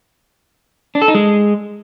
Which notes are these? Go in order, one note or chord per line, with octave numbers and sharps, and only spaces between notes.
D4
A4
D#4
G#3